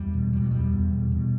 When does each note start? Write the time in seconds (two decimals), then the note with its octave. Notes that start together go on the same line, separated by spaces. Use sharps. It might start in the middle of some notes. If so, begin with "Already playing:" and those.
Already playing: E2 G3
0.14 B2
0.33 B2 G3
0.42 F#3
0.51 E2 G3
0.72 E2
0.93 B2
1.12 B2